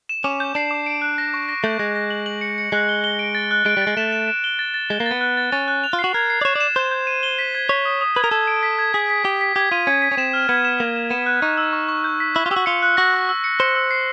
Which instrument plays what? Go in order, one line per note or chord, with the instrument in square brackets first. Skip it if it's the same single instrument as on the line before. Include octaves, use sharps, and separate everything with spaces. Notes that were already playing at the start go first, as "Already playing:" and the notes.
[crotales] E7
[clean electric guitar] C#4 [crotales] D6
[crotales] G6
[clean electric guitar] D4 [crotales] C7
[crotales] D6
D7
F#6
A#6
C#6
A#6
[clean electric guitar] A3 [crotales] G6
[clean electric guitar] G#3 [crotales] A#6
[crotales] A#6
F#7
F#7
C#7
C#7
[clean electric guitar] G#3 [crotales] F#6
[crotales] G7
G7
D7
A6
F#6
[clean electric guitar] G#3 [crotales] D7
[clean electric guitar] G3 [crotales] A6
[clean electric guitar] G#3
[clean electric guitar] A3 [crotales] E7
[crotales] E7
E7
G7
A6
A6
[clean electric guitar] G#3 [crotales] G7
[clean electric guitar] A#3
[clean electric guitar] B3 [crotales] A6
[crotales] F#6
A6
[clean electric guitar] C#4 [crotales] A6
[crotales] F#6
F7
[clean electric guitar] F4
[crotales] C7
[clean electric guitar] F#4
[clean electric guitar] A#4 [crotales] G#6
[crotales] C7
[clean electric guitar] D5
[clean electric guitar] C#5 [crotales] E7
[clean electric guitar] D5 [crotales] E7
[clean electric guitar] C5 [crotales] G6
[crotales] G6
D#7
G7
B6
G#6
[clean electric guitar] C#5 [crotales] B6
[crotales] D#6
D#6
[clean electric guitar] B4 [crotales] G#6
[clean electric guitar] A#4
[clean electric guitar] A4 [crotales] G#6
[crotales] D7
B6
G#6
[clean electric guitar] G#4 [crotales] B6
[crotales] B6
[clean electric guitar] G4 [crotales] B6
[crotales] B6
[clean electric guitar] G4 [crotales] G#6
[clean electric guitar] F4 [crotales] D#7
[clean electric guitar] C#4 [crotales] G#6
[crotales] B6
[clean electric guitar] C#4
[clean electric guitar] C4 [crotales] E7
[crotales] F6
[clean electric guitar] B3 [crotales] G#6
[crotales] E7
[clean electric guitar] A#3 [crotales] E7
[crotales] E7
[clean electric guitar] B3 [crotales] E7
[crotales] F#6
[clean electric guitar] D#4 [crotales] C#6
[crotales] E6
C#6
C#6
G6
B6
[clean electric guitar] E4 [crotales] C#6
[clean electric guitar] F4
[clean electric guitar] G4 [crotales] E6
[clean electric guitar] F#4
[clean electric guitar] F4 [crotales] C#7
[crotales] F#6
[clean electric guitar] F#4 [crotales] A#6
[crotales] C#6
E6
C#7
[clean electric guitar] C5 [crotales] C#7
[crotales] E6
C7